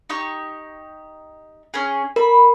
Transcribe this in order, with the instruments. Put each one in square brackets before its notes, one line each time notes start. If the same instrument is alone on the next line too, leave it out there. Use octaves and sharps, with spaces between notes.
[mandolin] D#4 G4 C#6
C#4 G#4
[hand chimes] A#4 [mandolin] B5